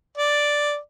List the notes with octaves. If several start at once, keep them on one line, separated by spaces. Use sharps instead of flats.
D5